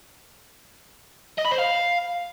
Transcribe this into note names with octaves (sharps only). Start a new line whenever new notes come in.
D#5
B5
C5
F5